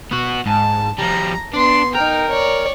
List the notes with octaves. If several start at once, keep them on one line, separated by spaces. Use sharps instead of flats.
B3 F#4
G#2 A5
F3 G3 A#5
B3 D4 C6
D#4 A#4 G5
C#5 D5